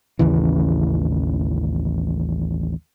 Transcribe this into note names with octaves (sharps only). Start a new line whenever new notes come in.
A1 D#2 C#3 E3